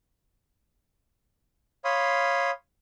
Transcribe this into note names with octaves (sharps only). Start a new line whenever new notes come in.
C#5 F5 B5 C6 D#6